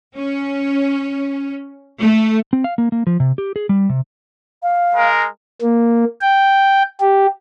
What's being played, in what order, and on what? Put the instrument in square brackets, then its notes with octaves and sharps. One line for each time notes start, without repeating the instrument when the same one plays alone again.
[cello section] C#4
A3
[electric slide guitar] C4
F5
A#3
A#3
F3
C3
G4
G#4
G3
C3
[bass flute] F5
[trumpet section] G#3 A#4
[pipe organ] A#3
G5
G4